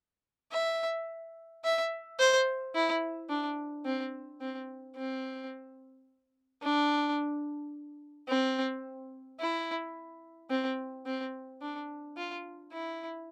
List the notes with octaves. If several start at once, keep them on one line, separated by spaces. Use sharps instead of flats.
E5
E5
C5
E4
D4
C4
C4
C4
D4
C4
E4
C4
C4
D4
F4
E4